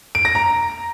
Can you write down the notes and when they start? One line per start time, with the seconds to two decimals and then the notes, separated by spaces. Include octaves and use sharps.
0.15 D7
0.25 A#6
0.35 A#5